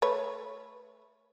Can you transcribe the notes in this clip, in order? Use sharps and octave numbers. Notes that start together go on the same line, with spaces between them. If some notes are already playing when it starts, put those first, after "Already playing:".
A3 B4 C#5